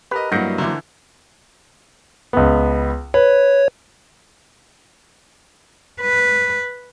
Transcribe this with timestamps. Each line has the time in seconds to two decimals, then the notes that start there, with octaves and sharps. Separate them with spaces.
0.11 G4 A#4 B4 D#5
0.32 G2 F#3 A#3 E4 F#5 G6 A#6
0.58 D3 E3 A#5 C6 D6
2.33 C#2 B3
3.14 B4 C#5
6.01 B4